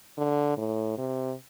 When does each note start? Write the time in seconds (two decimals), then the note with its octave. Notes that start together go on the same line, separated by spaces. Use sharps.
0.18 D3
0.58 A2
0.98 C3